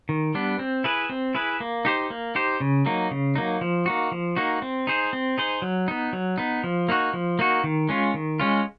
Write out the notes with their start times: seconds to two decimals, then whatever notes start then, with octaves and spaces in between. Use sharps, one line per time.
0.09 D#3
0.34 G3 B3 D4
0.59 C4
0.84 E4 G#4 B4
1.10 C4
1.35 E4 G#4 B4
1.60 A#3
1.85 D#4 G4 C5
2.10 A#3
2.35 D#4 G4 C5
2.60 C#3
2.86 F#3 A#3 D#4
3.11 C#3
3.36 F#3 A#3 D#4
3.61 F3
3.86 A#3 D#4 F#4
4.12 F3
4.36 A#3 D#4 F#4
4.62 C4
4.87 D#4 G#4 C5
5.13 C4
5.38 D#4 G#4 C5
5.62 F#3
5.88 B3 D#4
6.13 F#3
6.38 B3 D#4
6.64 F3
6.89 A#3 D#4 F#4
7.14 F3
7.39 A#3 D#4 F#4
7.64 D#3
7.89 G#3 C#4 F4
8.14 D#3
8.40 G#3 C#4 F4